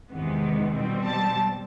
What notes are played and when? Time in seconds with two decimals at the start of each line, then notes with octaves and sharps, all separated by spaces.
0.11 E2 C3 D#3 G#3 B3
0.73 B2 G3 C4
1.05 A5